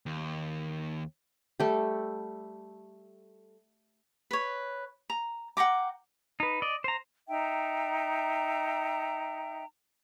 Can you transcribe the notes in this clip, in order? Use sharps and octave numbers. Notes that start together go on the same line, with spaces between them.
D#2
G3 A3 G4
B4 C#5
A#5
F#5 G5 A#5 D6
D#4 B4
D5 D#5
C5 A#5
D#4 E5 G5 A#5